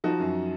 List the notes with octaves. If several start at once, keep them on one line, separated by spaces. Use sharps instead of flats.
F3 D#4 F#4
F#2